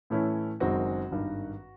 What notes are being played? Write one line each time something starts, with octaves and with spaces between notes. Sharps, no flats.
A2 E3 A3 C#4 E4
F#1 F#2 D#3 G#3 C4 F#4
G#1 G2 D#3